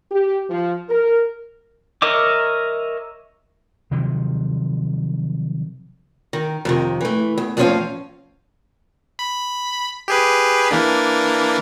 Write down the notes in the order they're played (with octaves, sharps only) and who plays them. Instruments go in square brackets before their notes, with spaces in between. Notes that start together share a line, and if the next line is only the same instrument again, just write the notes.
[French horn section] G4
F3
A#4
[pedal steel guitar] A#4 C#5 D#5 E5 D6
[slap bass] C3 D#3 F3 F#3
[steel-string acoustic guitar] D#3
F2 C3 D#3
E3 A3
E2
E2 A2 F3 C#4 C5 F5
[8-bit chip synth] B5
G4 G#4 B4
E3 A#3 D4